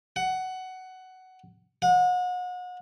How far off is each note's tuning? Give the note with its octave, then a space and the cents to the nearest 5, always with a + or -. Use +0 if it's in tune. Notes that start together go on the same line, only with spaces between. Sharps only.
F#5 +15
F#5 -35